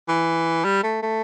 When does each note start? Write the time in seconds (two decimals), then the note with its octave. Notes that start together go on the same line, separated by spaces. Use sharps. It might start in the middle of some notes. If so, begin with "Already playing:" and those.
0.08 E3
0.64 G3
0.83 A3
1.03 A3